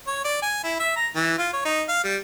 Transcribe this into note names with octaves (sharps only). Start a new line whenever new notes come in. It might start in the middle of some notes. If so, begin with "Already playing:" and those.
C#5
D5
G#5
E4
E5
A#5
E3
F4
C#5
D#4
F5
G3